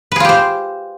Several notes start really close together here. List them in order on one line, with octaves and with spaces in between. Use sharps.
B4 G#4 F4 G4 C5